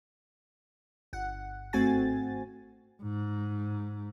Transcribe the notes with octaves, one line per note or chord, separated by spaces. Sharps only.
G1 F#5
G#1 A3 C4 F#4 G#5 A6
G#2